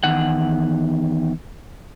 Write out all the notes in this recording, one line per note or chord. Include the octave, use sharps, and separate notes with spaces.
E2 D#3 F#5